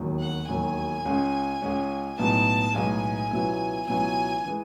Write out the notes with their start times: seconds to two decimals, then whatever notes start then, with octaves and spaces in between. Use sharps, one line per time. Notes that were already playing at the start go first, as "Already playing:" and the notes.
Already playing: E1 D#2 D#3 F#3
0.20 F#5
0.48 E1 D#2 D#3 F#3 G#5
1.05 C#2 C#3 G#3 C#4
1.61 C#2 C#3 G#3 C#4
2.17 B1 A2 G#3 B3 D#4 A5
2.74 B1 A2 G#3 B3 D#4 G#5
3.31 C#2 B2 F#3 B3 E4
3.86 C#2 B2 F#3 B3 E4 G#5
4.45 E3 G#3